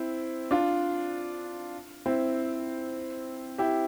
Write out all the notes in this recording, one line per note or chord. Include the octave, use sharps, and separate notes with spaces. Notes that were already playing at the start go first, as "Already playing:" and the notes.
Already playing: C4 E4
D4 F4
C4 E4
E4 G4